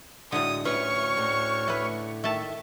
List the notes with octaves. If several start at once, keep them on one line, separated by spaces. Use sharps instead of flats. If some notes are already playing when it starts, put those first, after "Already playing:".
A2 D3 F#3 G#3 D#6
D2 C#4 E4 F4 B4 C#5 C#6 F6
A2 D3
A3 B4
D#3 A3 E5 A5